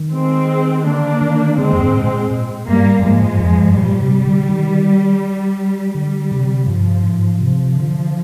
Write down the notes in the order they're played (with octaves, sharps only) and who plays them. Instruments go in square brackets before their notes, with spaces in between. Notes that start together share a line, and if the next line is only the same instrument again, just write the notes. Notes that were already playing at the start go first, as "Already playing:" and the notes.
Already playing: [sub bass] D#3
[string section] G#3 C4
[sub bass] D3 [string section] A#3 D4
[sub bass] D#3
[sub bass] D3 [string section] G#3 C4
[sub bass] F2
G2
G#2
A#2
A#2
[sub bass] G2 [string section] G3 A#3
[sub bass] G#2
G2
[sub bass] G#2 [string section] F3 G#3
[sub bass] G2
F2
G2
[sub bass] A#2 [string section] G3
[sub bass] C3
D3
D#3
[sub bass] D3 [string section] G3
[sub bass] C3
[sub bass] G2 [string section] F3
[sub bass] G#2
[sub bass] C3 [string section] F3
[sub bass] D3